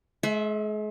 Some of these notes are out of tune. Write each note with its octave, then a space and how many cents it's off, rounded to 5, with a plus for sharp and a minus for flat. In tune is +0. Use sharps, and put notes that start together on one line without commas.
G#3 +40 E5 +0